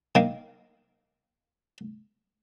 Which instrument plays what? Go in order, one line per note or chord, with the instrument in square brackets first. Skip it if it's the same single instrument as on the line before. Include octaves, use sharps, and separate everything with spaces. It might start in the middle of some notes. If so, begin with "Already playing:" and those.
[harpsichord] D#3 A#3